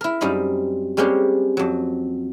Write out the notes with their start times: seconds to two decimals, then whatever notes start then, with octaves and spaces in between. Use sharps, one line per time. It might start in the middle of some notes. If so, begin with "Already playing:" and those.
0.01 E4 A#4
0.21 F#2 G3 C4 D#4 A#5 B5
0.97 G3 G#3 A#3 C4 C#4 G4
1.57 F2 F#3